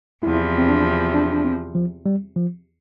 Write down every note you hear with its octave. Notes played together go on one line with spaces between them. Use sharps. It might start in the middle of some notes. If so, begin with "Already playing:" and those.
E2 C3 F3 E4
C4
D4
D4
D4
C4
F3
G3
F3